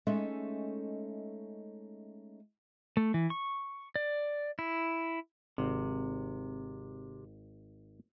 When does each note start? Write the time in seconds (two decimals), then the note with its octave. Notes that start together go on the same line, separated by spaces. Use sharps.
0.07 G#3 A3 C#4 D#4 A4 E5
2.97 A3
3.14 E3
3.30 C#6
3.96 D5
4.59 E4
5.58 G#1 C3